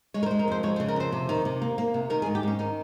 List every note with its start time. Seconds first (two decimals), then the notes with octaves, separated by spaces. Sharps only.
0.14 G#3 C#5
0.23 A#4
0.26 C5
0.31 G#3
0.39 A#4
0.48 F2 C5
0.63 G#3 C#5
0.76 C5
0.80 C#3
0.88 A#4
0.96 F2 C5
1.12 C3
1.29 D#3
1.45 C3
1.62 A#3
1.78 A#3
1.94 C3
2.10 D#3 A#4
2.22 G#4
2.26 G#2
2.35 G4
2.43 G#2 C#4
2.59 D#3 D#4